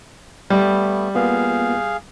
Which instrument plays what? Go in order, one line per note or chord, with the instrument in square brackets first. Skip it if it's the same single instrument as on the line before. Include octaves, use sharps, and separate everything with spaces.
[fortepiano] G3 [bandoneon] A3 B3
[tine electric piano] A#3 B3 F4 [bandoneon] G#4 F5